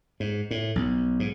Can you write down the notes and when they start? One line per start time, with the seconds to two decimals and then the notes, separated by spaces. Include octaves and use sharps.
0.20 G#2
0.51 A2
0.75 B1
1.20 G#2